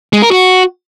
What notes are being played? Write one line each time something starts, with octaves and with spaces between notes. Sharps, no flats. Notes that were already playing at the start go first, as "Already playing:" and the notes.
G#3
A#4
F#4